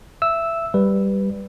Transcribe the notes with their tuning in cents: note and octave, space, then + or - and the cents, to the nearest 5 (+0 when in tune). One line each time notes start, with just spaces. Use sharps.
E5 +15 E6 -5
G3 +0 B4 +0